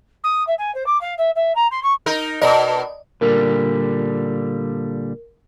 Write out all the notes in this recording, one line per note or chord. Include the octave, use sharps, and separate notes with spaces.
D#6
E5
G#5
C5
D6
F5
E5
E5
A#5
C6
C#6
D#4 A#4
B2 A#4 D5 D#5
A#2 D3 G3 A#4